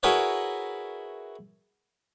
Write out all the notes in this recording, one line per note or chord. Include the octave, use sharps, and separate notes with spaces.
E4 F#4 G#4 A#4 B4 C#5